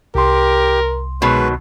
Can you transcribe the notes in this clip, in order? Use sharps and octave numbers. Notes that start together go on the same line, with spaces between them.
C2 G4 A#4 C6
B2 D#3 F#3 G#3 B4